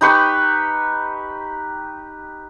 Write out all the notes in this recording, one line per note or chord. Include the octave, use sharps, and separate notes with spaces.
D#4 G4 B4 C#6